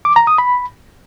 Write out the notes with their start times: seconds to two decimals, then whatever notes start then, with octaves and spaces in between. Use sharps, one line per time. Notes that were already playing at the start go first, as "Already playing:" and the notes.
0.05 D6
0.16 A#5
0.27 D#6
0.38 B5